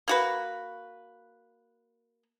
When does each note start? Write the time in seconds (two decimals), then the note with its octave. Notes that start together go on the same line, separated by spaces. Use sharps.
0.08 A#3 F#4 B4